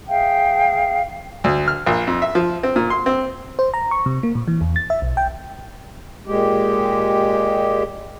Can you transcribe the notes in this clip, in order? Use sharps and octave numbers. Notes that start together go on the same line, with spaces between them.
G#4 E5 F5 G5
D2
F6
A#1
F2
E5
F3
C4
A#2
C6
C4
C5
A#5
C#6
C3
A#3
A#2
E3
E2
A6
E5
B1
G5
A#2 G#3 G4